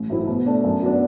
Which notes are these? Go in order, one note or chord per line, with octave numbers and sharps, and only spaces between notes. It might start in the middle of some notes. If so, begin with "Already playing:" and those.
Already playing: A1
A2 F#3 C4 E4
B2
A3 D4
F#2
F#3 B3 D4